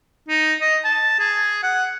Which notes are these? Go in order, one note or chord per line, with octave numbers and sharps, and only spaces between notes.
D#4
D#5
A5
G#4
F#5